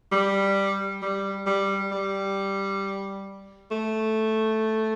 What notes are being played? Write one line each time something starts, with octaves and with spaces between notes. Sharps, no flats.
G3
G3
G3
G3
A3